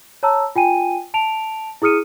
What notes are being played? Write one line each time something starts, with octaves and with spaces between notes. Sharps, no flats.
C#5 A5 A#5 E6
F4 G5 G#5 D#7
A5 D7 F7
E4 G#4 D#6 F6 C#7 D#7